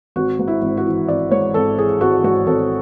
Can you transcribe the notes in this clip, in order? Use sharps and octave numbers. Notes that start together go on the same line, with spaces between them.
G#1 F#4
G#2
E4
G#1
F#4
E3
G#1 D5
G#2 C#5
G#1 A4
E3 G#4
G#1 F#4
G#2 F#4
G#1 A4